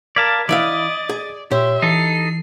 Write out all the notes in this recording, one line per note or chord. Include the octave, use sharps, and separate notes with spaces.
A#4 D5 F5 A5 G#6 B6
E3 E4 D5 D#5 F5 A6
G#4
A#2 G4 C#5 E5 C6
E3 D#4 A4 C7